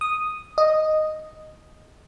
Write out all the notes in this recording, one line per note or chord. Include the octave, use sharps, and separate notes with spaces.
D#6
D#5